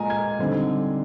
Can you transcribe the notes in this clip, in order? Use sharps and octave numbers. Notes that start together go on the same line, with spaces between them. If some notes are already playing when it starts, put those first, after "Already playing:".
Already playing: A#2 G#3 F4 D#5 G#5 A#5
G#6
D3 G3 C4 D#4